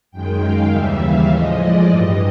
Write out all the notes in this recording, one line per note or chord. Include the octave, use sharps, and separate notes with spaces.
F#2 D#3 G#3 G5
F5
D#2 C#3 E3 G3 E5
F5
A2 F3 G#3 D#5
D5
G2 E3 G3 D#5